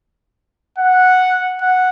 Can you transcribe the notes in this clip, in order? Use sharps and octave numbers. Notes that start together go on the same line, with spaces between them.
F#5
F#5